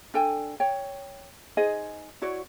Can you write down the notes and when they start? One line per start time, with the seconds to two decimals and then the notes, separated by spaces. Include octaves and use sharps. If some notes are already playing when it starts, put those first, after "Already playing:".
0.14 D4 A4 G5 G#5
0.60 C#5 G5
1.57 D#4 G#4 C5 D#5
2.22 E4 F#4 C#5 D5